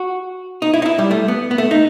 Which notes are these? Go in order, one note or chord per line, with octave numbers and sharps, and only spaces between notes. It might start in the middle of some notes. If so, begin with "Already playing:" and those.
Already playing: F#4
D#4
E4
D#4
E4
G3
A3
B3
B3
A3
D#4